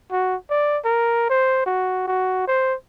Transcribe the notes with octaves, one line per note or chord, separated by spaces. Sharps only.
F#4
D5
A#4
C5
F#4
F#4
C5